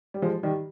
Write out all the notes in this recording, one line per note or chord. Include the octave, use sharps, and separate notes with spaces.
G3
F3 G#3
D#3 G3